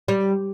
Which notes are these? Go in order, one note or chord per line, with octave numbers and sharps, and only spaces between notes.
G3